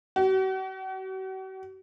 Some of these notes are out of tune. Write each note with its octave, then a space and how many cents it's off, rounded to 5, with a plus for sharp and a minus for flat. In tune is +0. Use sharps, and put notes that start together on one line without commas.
F#4 +45